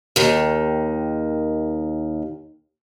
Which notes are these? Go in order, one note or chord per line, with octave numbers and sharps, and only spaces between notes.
D#2 D#3